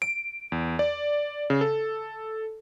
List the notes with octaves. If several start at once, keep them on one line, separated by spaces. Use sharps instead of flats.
D7
E2
D5
C#3
A4